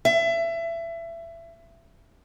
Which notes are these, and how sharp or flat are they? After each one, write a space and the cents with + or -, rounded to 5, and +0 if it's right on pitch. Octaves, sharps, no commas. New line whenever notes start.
E5 +25